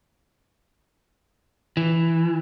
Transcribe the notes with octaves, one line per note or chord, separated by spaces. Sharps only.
E3